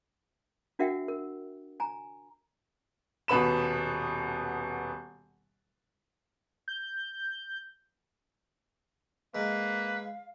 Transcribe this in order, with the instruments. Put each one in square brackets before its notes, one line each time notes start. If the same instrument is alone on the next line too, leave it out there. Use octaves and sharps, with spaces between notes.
[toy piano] D4 F#4 A#4 E5 F#5 G5
A#4
G#5 A#5
[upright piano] D#1 B2 B3 B5 E7
[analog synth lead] G6
[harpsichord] G#3 [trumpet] A#3 [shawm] B4 [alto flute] F5